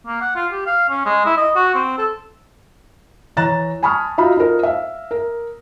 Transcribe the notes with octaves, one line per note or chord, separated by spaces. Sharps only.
A#3
F#5
F4
G4
F5
C#4
G#3
E4
D#5
F#4
C4
A4
E3 C#5 A#5 F#6 A6 E7
G#5 A5 B5 C#6 D#6 F6
D#4 F4 F#4 E5 F5 B5
D#4 F4 A4 A#4 C5
E5 F5
A#4